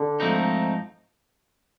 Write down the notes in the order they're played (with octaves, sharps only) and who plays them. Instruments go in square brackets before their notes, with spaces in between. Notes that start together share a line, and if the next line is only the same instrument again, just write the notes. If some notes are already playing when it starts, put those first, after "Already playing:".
Already playing: [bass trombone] D3
[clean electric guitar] G#2 F3 A3 C4 D#4